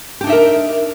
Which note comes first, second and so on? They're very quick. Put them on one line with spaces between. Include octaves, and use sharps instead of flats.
G4 D4 D#4 E5 A#4